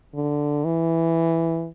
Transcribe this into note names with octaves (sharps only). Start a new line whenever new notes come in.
D3
E3